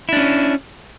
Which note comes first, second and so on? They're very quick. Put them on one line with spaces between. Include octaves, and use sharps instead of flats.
E4 D4 C#4